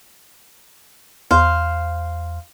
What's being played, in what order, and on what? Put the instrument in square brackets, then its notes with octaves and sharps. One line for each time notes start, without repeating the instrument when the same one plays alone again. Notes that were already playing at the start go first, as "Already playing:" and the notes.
[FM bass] E2 [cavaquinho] C5 F5